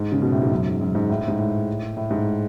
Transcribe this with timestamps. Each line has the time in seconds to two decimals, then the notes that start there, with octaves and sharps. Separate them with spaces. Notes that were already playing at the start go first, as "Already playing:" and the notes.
Already playing: G#2
0.12 C#3
0.22 B2
0.32 A2
0.42 G#2
0.51 F#2
0.66 G#2
0.81 F#2
0.95 G#2
1.09 A2
1.28 G#2
1.39 A2
1.97 A2
2.10 G#2